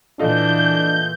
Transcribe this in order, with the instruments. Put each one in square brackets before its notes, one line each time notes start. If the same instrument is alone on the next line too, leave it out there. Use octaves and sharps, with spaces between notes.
[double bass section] A#2 E3 [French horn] D4 [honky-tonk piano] F4 A4 D#5 [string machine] G6